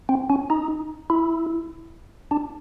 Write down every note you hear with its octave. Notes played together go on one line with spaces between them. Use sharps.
C4
C#4
D#4
E4
D4